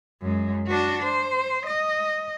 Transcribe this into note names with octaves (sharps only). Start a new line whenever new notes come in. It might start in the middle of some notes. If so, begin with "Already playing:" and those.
F#2 G#3
D4 F#4
C5
D#5